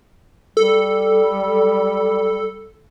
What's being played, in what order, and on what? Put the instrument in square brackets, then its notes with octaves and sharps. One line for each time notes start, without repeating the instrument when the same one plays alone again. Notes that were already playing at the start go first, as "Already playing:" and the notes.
[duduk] G3 [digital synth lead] A4